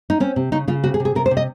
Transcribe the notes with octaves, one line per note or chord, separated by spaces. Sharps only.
D#4
C4 C#4
C3
C#3 D#4
C#3 F4
C3 F#4
G#4
C3
G#4
C3 A#4
C5
C3
D#5